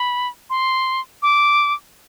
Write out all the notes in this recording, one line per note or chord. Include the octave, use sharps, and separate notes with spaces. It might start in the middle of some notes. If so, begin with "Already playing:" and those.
Already playing: B5
C6
D6